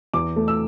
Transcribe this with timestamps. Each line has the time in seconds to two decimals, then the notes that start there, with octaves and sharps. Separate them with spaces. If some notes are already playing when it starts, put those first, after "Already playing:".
0.14 E2 D6
0.36 A3
0.48 E6